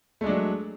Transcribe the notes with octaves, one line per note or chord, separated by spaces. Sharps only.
F#3 G#3 A3 D4